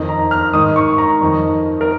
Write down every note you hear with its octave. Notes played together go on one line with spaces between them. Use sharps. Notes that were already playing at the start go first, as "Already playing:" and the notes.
Already playing: F2 D#3
A#5
F6
G#2 D#3 D#6
C#6
A#5
F2 D#3
A#4